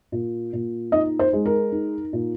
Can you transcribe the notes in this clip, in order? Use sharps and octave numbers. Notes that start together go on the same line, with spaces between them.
A#2
A#2
D#4 D#5
C5
G#3
A#4
D#4
A#2